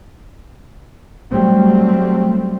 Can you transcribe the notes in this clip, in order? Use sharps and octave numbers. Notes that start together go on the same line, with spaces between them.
F#3 G3 A3 C4